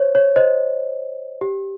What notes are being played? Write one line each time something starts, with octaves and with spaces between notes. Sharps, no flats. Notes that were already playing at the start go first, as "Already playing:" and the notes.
Already playing: C5 C#5
C#5
C5 D#5
G4